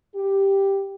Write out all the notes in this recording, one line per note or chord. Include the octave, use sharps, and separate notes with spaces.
G4